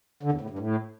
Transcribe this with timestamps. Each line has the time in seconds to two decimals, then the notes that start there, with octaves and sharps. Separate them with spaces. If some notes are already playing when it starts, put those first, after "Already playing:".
0.23 D3
0.32 E2
0.41 A2
0.50 G2
0.59 A2